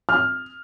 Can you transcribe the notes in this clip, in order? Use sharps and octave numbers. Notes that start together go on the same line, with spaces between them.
F6